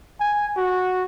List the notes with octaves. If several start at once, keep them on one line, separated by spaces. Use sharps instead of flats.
G#5
F#4